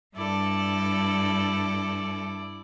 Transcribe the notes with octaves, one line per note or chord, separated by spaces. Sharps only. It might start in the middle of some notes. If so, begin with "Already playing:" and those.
G2 E4 A4 D5